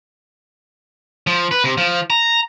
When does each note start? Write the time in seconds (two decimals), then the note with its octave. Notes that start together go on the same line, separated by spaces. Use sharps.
1.27 F3
1.51 B4
1.64 C3
1.78 F3
2.10 A#5